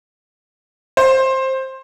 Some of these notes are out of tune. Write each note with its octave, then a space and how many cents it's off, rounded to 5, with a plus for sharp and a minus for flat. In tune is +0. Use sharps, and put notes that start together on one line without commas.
C5 +15